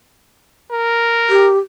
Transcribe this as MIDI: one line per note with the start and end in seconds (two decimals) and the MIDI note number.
0.71 1.50 70
1.29 1.58 67